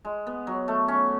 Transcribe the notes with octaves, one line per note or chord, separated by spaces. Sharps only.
G#3
B3
F#3
A3
C#4